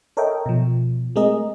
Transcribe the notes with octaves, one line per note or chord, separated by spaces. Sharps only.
A4 A#4 C#5 D#5 E5 G5
B2 F3
G#3 A3 C4 G#4 A#4 D#5